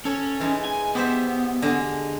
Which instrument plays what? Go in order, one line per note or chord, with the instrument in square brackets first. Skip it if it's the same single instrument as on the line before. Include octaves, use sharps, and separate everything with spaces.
[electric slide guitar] C#4 [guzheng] A4 C#5
[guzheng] E3 G#3 D#4
[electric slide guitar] G#5
[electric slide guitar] B3 [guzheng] G4 C5 E5
[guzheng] D3 G#3 D4